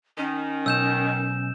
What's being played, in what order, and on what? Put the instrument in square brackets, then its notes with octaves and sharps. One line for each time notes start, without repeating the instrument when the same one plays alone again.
[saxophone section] D#3 [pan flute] C#4
[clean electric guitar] B1 [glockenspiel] E6 G6 E7